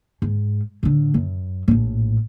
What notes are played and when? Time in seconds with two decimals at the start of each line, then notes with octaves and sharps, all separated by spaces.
0.22 G#2
0.83 A2 D3
1.14 F#2
1.68 A#1 A2